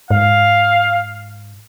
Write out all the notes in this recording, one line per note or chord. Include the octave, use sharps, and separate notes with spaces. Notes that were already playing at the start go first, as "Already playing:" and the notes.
G#2 F5